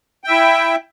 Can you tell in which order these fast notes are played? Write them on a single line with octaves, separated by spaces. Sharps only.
G5 E5 E4